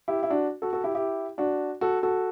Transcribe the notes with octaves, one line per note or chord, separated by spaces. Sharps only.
E4 G4
E4
D4 F#4
F#4 A4
F#4 A4
E4 G4
E4 G4
D4 F#4
F#4 A4
F#4 A4